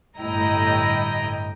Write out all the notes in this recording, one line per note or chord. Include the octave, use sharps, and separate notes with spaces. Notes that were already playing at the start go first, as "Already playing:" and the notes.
G1 A2 E4 D#5 G5 A#5